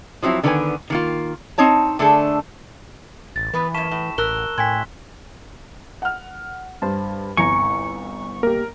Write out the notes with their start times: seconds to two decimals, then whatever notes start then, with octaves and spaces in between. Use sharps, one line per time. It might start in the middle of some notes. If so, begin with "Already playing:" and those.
0.22 F3 F#3 C4 E4
0.43 D3 D#3 B3 D#4 B4 G#5
0.90 D#3 A#3 F4
1.58 C4 D#4 C#5 A5
1.99 D3 A3 D4 G#4 A4
3.36 A1 A6
3.54 E3 B3 B4
3.74 F#2 A#3 A5 C#6 B6 E7
3.91 A2
4.18 A1 A#4 E6 F#6 G7
4.58 A2 G5 G#5 C6 G#6 B6
6.02 F#5 F6
6.82 G2 C5 A5
7.37 G1 C2 G#5 A#5 C#6 C#7
8.43 A#3 G4 A#4